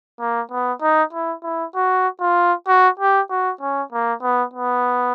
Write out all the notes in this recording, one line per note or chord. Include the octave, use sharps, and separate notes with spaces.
A#3
B3
D#4
E4
E4
F#4
F4
F#4
G4
F#4
C#4
A#3
B3
B3